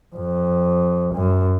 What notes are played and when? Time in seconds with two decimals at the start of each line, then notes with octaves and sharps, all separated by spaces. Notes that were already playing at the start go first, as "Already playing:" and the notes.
0.16 F2
1.14 F#2